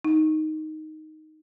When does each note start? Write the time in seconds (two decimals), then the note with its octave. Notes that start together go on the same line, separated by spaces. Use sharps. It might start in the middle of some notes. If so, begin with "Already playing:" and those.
0.05 D#4